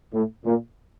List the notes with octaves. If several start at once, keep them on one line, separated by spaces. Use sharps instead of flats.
A2
A#2